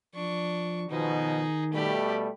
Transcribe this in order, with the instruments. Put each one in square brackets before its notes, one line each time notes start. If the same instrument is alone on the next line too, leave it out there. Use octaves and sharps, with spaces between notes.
[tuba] F3 [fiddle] D4 C#6
[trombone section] B2 F3 [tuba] D#3 [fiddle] D#4 G#4
[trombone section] B2 G3 A3 [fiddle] G4 B5